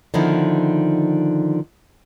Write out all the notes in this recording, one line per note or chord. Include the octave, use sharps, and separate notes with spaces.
D3 D#3 F3 B3 D#4 E4